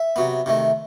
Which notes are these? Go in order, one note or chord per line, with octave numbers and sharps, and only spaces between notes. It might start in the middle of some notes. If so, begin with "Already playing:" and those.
Already playing: E5
C3 F#3 B3
C3 D#3 A3